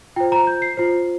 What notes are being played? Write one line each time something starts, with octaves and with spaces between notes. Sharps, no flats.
F4 C5 G5
A#5
G6
C7
F4 C5 C7